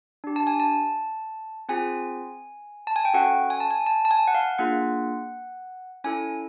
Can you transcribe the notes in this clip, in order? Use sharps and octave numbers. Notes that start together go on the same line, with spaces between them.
D4 G4
A5
G#5
A5
C4 F4 G#4 G#5
A5
G#5
G5
C#4 F#4 A4 F#5
G#5
A5
G#5
A5
A5
G#5
F#5
F5
A#3 D4 F4 G#4 F#5
C#4 E4 A4 G#5